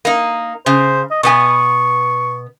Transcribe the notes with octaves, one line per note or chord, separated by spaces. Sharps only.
A#3 D#4
C#3 C5
D#5
B2 B3 G#5 C#6